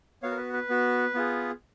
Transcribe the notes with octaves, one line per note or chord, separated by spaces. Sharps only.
B3 F#4 C#5 F5
A#4
B4
B4
B3 F#4
B3 F4 G#4